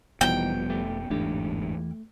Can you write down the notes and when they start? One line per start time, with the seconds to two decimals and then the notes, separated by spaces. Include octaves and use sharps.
0.21 F1 B2 E3 F3 G3 B3 D#4 G5
0.70 A3 G4
1.10 G1 E2 G#2 E3 A3 D4 G4